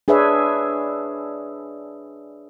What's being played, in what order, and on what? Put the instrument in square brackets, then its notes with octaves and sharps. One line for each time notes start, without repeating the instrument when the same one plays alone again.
[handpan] D4 G#4 B4 C#5 E5